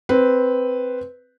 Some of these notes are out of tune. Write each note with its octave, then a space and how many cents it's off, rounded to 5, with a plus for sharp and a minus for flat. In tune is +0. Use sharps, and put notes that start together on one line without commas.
C4 -5 B4 +0